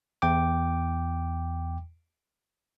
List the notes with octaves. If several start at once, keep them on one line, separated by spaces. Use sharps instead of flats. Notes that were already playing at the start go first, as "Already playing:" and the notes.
E2 G5 D6